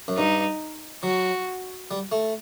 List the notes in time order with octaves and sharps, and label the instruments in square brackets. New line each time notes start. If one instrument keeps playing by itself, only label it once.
[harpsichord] F#2
[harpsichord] G2 [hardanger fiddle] D#4
[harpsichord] F#3 [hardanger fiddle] F#4
[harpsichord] G3
A3